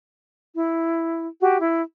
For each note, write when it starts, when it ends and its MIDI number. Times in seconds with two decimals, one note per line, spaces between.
0.53 1.26 64
1.41 1.56 66
1.41 1.56 67
1.59 1.81 64